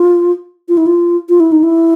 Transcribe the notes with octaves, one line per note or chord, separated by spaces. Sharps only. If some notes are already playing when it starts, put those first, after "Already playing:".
Already playing: F4
F4
E4
F4
F4
E4
D#4
E4